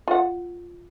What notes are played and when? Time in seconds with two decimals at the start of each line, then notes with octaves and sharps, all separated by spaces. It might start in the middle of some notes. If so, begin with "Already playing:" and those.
0.08 F4 F#5